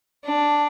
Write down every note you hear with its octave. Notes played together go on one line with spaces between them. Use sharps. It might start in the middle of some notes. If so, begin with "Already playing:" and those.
D4